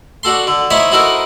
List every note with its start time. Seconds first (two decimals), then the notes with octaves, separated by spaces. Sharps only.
0.23 D4 F#4 A4 C6
0.47 D3
0.70 D#4 E4 C5 C#5 E5
0.92 D#4 E4 F#4 A4 A#4 C5